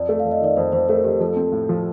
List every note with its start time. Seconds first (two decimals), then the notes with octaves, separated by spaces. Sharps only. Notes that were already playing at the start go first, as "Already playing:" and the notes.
Already playing: F2 D5
0.09 A3
0.19 F5
0.25 F2
0.31 D#5
0.42 D#3 D5
0.56 F2 C5
0.72 F2 C5
0.89 A3 A#4
1.04 F2 G4
1.20 F3 A4
1.36 C4
1.52 A2
1.69 F3